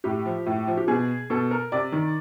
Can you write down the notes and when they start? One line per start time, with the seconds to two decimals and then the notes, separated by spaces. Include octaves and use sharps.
0.04 A2 G4
0.25 F3
0.46 A2
0.67 F3
0.77 G4
0.88 B2 G#4
1.30 B2 A4
1.51 A#4
1.72 C3 D5
1.92 D#3